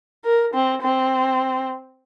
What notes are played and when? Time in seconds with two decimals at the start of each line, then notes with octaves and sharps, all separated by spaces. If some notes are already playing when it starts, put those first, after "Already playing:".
0.24 A#4
0.54 C4
0.82 C4